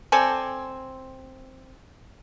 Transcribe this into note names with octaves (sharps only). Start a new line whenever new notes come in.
C4 A4 D5 G#5